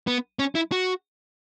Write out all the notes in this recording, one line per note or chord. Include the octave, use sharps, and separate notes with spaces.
B3
C#4
E4
F#4